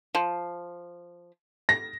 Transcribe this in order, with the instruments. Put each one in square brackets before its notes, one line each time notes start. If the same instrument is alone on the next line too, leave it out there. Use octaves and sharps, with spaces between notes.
[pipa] F3
[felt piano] A#6